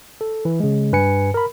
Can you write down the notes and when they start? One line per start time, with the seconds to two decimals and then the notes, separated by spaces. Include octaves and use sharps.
0.21 A4
0.45 E3
0.60 C#3 G#3
0.93 G2 B4 G#5 C#7
1.34 A#4 B5